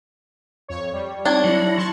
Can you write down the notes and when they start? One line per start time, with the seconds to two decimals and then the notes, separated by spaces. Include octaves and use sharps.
0.68 F2 C#5
0.93 G3
1.25 C4 D4 D#4 C#5
1.44 F#3 E4
1.77 A5 C6 C#6